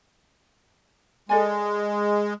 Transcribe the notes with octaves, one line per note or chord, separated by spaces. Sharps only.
G#3 A4 D5 G#5